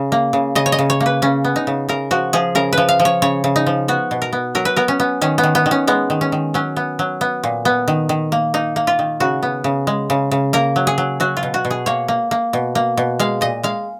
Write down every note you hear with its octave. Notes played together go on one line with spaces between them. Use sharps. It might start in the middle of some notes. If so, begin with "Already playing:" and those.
Already playing: C#3
A#3
C#3
C#3 D#5
C#5
D#5
C#3
C#5
A#3
B4
C#3 C#4
B3
D#4
C#3
C#3 A#4
F3 F#4
F3 G#4
C#3 A#4
F3 B4
F5
F3
C#5
C#3 C#5
C#3
D#4
F3
B3 F#4
B2
A#4
B3
F#3 A#4
B4
B3 A#4
C#4
B3
D#3 C#4
B3
D#3
B3
D#3
C#4
G#3 B3
D#3
C#4
D#3
F#3 C#4
B3
F#3
B3
A#2
B3
D#3
D#3
A#3
A#3 D#4
A#3
F4
D#3
C#3 F#4
B3
C#3
G#3
C#3
C#3
A#3 A#4
F#3
G#4
F#3
F#3 F#4
F4
B2
F#4
B2
G#4
A#3 C#5
A#3
A#3
B2
A#3
B2
G#3 F5
A#2 D#5
G#3 F5